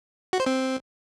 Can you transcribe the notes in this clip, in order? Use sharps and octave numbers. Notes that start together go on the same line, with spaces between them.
F#4
C5
C4